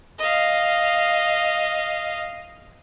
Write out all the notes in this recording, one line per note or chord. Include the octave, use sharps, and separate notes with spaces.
D#5 F5